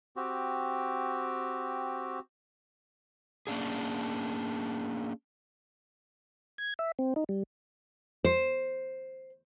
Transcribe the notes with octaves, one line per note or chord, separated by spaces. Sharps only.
C4 F#4 G4
A#3 C#4 D4 G#4
G#6
E5
C4
D#4
G3
C5